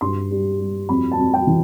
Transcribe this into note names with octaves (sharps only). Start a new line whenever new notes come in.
G2 C6
G3
G3
F2 B5
A5
F2
G5
E3